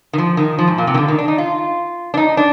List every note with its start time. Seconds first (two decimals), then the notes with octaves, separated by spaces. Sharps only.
0.13 D#3
0.18 F3
0.37 D#3
0.58 F3
0.68 G#2
0.78 A#2
0.87 C3
0.94 D#3
0.97 D3
1.08 D#3
1.19 D4
1.28 D#4
1.38 F4
2.14 D4
2.17 D#4
2.37 D4